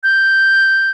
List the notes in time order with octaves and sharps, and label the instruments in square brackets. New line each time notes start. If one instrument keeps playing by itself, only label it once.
[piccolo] G6